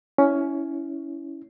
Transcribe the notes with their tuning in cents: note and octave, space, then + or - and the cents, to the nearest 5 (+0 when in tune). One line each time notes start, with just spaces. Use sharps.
C#4 +15 E4 -10